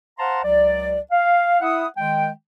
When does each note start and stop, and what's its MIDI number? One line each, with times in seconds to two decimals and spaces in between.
0.19 0.43 72
0.19 0.43 77
0.19 0.43 78
0.19 0.43 81
0.19 0.43 82
0.19 0.43 84
0.44 0.99 37
0.44 0.99 54
0.44 0.99 74
1.12 1.60 77
1.61 1.86 64
1.61 1.86 76
1.61 1.86 78
1.61 1.86 87
1.97 2.29 51
1.97 2.29 56
1.97 2.29 79